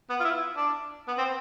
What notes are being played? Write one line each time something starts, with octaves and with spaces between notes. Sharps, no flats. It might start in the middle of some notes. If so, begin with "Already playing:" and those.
B3
F4
E4
D4
B3
C4